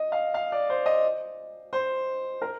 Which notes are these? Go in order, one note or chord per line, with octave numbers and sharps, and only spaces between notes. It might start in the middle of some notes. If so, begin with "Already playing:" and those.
Already playing: D#5
F5
F5
D5
C5
D#5
C5
A#4